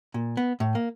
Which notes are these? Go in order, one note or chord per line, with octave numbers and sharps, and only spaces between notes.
A#2
B3
A2
A#3